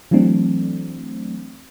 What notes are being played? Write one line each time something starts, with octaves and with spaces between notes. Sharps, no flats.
E3 F#3 A3 C4 D4